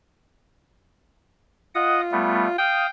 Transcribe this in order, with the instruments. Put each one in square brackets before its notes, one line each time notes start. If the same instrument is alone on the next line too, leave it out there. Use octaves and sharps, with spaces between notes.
[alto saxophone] F4 [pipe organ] D#5 F#5 D#6
[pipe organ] G3 A3 B3
[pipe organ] F5 D#6 [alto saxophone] G5